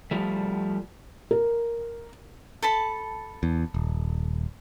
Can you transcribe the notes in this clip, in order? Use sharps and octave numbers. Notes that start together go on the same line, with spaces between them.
F3 G3 A3
A#4
A4 A5 B5
E2
D#1